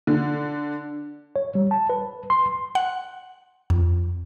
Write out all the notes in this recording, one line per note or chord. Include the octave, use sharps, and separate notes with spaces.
D3
C#5
G3
A5
B4
C6
F#5
F2